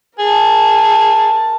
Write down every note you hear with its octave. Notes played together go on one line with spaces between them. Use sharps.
G#4 A#4 A5